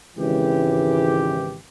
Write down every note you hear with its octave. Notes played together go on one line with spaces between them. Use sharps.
G#1 C#3 E3 G4